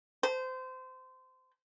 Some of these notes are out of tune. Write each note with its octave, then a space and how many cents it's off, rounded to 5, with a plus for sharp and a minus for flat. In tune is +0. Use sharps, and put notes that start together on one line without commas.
C5 -25